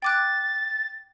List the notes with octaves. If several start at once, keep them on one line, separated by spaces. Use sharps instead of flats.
G5 D6 F#6 A6